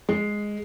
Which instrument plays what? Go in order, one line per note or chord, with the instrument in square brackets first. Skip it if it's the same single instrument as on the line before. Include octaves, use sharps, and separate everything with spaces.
[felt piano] G#3